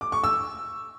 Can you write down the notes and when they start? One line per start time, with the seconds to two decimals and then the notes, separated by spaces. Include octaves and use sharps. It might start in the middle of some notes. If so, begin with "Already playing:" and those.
0.01 D6
0.12 C#6
0.24 E6